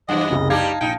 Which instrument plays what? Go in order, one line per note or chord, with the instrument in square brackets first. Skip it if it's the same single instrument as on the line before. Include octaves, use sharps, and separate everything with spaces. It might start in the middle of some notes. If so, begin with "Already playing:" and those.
[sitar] F#2 C3 E3 [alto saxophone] D#5 [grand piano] F#5
[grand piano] F#1 C2 C#3
[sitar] G2 G3 G4 [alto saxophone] D#4 [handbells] F5 A5 [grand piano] G#6
[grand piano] A#1 [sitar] D#4 [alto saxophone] G5